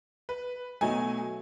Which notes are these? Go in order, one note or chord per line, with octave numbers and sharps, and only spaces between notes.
B4
B2 F#3 A3 D#4 G#5